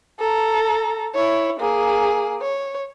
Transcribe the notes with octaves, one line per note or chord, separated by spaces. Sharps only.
A4 A#5
E4 C#5
A#3 G#4
C#5